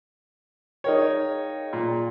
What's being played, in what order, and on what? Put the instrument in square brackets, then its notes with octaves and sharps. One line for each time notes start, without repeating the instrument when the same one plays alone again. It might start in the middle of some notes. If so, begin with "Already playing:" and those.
[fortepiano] D#4 A#4 C#5 [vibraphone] G#4 F5 G5
[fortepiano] A#2